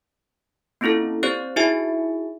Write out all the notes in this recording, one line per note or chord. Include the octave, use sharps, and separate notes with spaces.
A#3 C4 C#4 E4 F4 A4
C4 G4 C5 D5 F#6
D#4 E4 F#4 G#4 E5 G#5